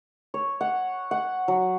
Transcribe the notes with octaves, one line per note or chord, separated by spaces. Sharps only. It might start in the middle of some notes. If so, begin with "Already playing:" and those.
C#5
F#5
F#5
F#3